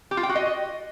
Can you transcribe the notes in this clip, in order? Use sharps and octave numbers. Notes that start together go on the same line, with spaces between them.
G4
F4
G5
F#4
D#5